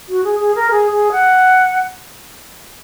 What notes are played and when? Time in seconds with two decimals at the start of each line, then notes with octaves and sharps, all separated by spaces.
0.09 F#4
0.24 G#4
0.40 G#4
0.55 A#4
0.71 G#4
0.92 G#4
1.12 F#5